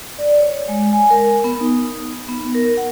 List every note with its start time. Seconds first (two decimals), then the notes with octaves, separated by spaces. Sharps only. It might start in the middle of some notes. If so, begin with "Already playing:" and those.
0.18 D5
0.39 C#5
0.69 G#3
0.93 G#5
1.10 A#4
1.44 B3
1.60 D#4
2.29 B3
2.54 A#4
2.77 F#5